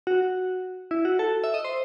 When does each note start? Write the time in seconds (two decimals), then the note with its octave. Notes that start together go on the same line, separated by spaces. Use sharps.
0.07 F#4
0.91 E4
1.05 F#4
1.19 A4
1.44 E5
1.54 D#5
1.65 C5